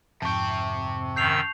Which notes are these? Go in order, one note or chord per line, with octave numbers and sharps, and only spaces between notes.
F2 G#2 C3 G5 A5 C#6
F#2 D#3 E6 G6 C7 F7